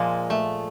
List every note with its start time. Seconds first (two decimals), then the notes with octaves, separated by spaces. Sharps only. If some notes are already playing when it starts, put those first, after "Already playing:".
Already playing: A#2 F3 G#3 A#3
0.30 A3